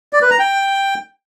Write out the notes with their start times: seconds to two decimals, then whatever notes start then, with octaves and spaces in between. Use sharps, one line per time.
0.13 D5
0.22 B4
0.30 A#5
0.39 G5